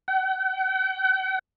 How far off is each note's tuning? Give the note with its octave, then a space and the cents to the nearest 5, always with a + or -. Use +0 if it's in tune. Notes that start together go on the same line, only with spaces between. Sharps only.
F#5 +45